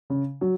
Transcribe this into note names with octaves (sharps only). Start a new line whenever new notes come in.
C#3
F#3